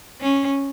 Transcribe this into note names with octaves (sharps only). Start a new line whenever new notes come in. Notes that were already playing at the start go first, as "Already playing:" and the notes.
C#4